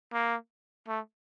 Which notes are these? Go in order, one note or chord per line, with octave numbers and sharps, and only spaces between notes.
A#3
A3